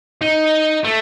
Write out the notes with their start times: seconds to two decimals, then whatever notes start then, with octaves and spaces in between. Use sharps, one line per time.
0.21 D#4
0.84 A3